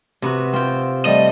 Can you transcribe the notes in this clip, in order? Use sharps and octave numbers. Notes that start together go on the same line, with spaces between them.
C3 B3 F#4
C4 F4 G5
G3 A3 D#5